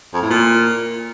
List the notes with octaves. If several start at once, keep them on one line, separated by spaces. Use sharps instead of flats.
F2
A2
A#2